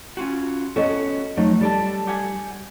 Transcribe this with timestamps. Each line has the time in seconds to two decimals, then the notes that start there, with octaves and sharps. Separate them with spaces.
0.17 C#4 F4 F#4
0.76 B3 C#4 F#4 A4 C#5 D#5
1.37 F3 F#3 A3 D#4
1.61 G3 A4 D5 A5
2.07 G4 F#5 G#5